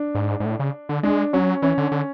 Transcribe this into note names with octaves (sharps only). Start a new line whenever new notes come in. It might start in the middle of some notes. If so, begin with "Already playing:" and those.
Already playing: D4
G#2
G#2
A2
C#3
D3
G#3 D4
F#3 C#4
E3 C#4
D3
D3